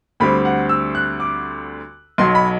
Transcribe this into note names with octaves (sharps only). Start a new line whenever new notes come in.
D2 D3 G3 C4 B5
F#5
E6
F#6
D6
B1 B2 F#3 C6
B5